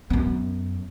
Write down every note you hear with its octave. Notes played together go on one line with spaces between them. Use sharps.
F#2 B3